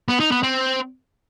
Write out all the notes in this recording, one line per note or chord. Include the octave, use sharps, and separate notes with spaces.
B3
D#4
B3
C4